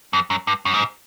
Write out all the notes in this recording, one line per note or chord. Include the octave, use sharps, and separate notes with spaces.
F2
F#2
G2
F#2
G#2